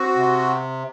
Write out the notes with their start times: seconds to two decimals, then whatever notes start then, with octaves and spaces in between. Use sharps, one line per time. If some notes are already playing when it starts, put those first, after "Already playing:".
Already playing: C4 F#4
0.16 C3